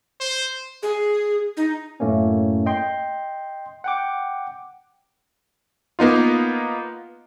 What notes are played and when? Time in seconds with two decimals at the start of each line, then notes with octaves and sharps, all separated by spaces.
0.20 C5
0.83 G#4
1.57 D#4
2.00 F#2 A2 A3 A#3 C#4
2.66 D#5 G5 C6
3.84 F#5 G5 D6
5.99 A#3 B3 D#4 F4